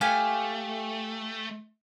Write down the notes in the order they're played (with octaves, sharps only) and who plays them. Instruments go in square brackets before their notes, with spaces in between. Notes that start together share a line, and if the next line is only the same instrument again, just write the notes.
[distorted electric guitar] A3 [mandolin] G4 F5 G#5